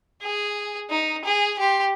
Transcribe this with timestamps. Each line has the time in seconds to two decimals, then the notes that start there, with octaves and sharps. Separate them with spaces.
0.22 G#4
0.90 D#4
1.25 G#4
1.59 G4 C6